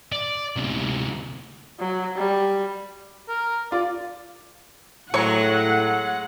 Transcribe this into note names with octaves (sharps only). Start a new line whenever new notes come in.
D5
D2 C3
F#3
G3
A#4
F4 D5
A2 F#3 G#3 G#4 C#5 F#5 C#6